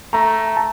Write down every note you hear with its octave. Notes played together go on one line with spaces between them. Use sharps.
A3 A#5
A5